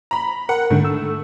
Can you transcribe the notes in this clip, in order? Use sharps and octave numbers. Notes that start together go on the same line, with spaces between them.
A#5 B5
A#4 F#5
G#2 D3 A3
E6